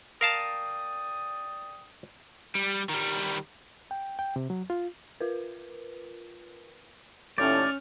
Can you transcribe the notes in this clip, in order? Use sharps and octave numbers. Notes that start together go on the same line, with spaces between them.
A#4 D5 F5 G5 A5 D#6
G3
D#3 G3
G5
G5
C3
F#3
F4
F4 A#4 B4
D#2 A2 C#4 D5 F6 G6